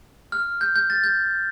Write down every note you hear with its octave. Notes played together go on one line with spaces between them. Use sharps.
F6
G6
G6
A6
G6